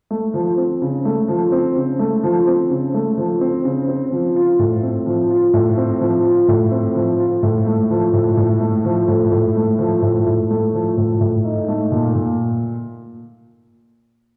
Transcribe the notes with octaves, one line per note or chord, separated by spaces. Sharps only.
A3
F3
C4
C#3
A3
F3
C4
C#3
A3
F3
C4
C#3
A3
F3
C4
C#3
C4
F3
F4
A2
C4
F3
F4
A2
C4
F3
F4
A2
C4
F3
F4
A2
A3
F3
A2
A2
A3
F3
A2
A2
A3
F3
A2
A2
A3
F3
A2
A2
D#4
A3
A#2
A#2